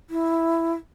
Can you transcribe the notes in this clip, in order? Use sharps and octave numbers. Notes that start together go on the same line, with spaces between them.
E4